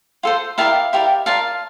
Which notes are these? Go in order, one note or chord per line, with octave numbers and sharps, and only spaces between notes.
F4 A4 C5
E4 G4 A#4 D5 F5 A5
E4 G4 A#4 D5
F4 A#4 D5 F5 A5